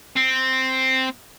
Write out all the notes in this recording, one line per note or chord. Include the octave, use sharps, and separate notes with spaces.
C4